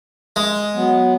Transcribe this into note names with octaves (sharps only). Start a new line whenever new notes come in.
G#3
F#3 B3